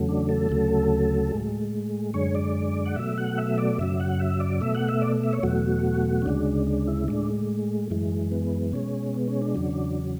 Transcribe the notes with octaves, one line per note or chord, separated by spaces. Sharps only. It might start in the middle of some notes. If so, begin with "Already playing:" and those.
Already playing: E2 C#3 F#3 A3
D4
A4
D2 C#3 F#3 A3
A2 G#3
F#2 D3 G#3 C#5
D5
F#5
B2 F#3 A3 E5
F#5
E5
D5
F#2 C#3 F#3 E5
F#5
E5
D5
B2 A3 E5
F#5
E5
D5
E5
C#5
E2 B2 F#3 A3 F#4
C#4
D2 C#3 G#3 D4
D4
E4
A2 G#3 D4
F#2 E3 G#3
B3
B2 G#3 C#4
B3
C#4
D4
E2 C#3 F#3